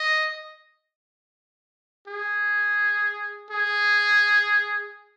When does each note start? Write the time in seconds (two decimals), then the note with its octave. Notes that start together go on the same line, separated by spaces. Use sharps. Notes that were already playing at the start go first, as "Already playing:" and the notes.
Already playing: D#5
2.08 G#4
3.51 G#4